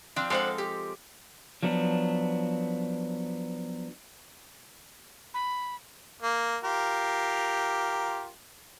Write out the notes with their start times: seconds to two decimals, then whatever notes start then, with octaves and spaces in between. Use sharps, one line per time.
0.16 F3 C4 D4
0.30 G#3 D4 A4 C5 F5 F#5
0.58 G4
1.63 F3 F#3 B3 D4
5.34 B5
6.22 A#3
6.64 F4 G4 A#4